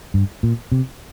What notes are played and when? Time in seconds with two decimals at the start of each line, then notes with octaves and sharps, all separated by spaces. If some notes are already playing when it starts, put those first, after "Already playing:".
0.14 G2
0.43 A#2
0.72 C3